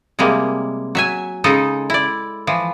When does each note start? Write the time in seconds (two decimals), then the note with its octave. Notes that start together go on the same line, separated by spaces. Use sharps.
0.19 C3 G3 G#3 A#3
0.95 F#3 E5 G#5
1.44 C#3 G#3 D#4 A4
1.90 E4 D5
2.47 E3 F3